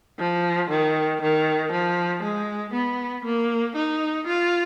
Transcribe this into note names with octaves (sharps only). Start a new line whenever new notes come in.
F3
D#3
D#3
F3
G#3
B3
A#3
D#4
F4